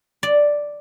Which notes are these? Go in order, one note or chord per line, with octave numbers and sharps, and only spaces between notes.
D5